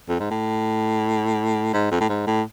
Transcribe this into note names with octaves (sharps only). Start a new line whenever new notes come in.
F2
G#2
A2
G#2
F2
A2
G#2
A2